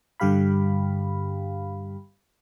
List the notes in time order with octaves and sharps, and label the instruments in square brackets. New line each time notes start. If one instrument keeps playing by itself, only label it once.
[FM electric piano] G2 D3 G3 G4 F5 B5